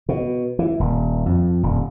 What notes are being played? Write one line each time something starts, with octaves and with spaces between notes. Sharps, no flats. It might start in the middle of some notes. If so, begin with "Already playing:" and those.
B2
E3
D#1
F2
D#1